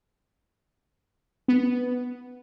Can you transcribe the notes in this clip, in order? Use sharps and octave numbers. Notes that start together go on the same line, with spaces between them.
B3